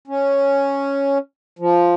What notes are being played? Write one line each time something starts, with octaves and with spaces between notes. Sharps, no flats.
C#4
F3